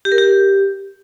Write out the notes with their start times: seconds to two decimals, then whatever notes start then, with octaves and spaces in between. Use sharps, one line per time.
0.05 G4
0.12 A#4
0.18 G4